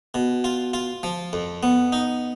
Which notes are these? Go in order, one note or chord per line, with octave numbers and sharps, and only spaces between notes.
B2
F4
F4
F3
F2
B3
D#4